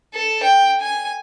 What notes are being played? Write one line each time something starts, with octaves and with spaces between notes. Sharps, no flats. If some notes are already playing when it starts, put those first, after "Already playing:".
A4
G5
G#5